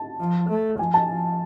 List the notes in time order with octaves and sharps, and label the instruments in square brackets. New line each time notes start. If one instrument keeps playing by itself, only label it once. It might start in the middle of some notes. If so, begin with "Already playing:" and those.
Already playing: [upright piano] A5
[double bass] F3
A3
[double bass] F3 [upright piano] G#5
[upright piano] A5
[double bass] F3